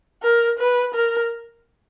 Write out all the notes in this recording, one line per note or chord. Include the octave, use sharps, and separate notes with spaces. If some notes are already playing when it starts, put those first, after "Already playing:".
A#4
B4
A#4